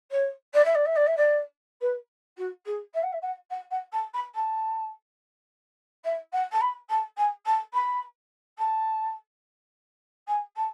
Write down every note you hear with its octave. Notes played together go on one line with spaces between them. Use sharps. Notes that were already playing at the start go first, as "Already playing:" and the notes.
C#5
D5
E5
D5
E5
D5
E5
D5
B4
F#4
G#4
E5
F#5
E5
F#5
F#5
F#5
A5
B5
A5
E5
F#5
A5
B5
A5
G#5
A5
B5
A5
G#5
A5